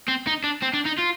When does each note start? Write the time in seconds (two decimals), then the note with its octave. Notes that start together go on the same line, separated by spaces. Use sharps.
0.08 C4
0.27 D#4
0.44 D4
0.62 C4
0.73 D4
0.85 D#4
0.98 F4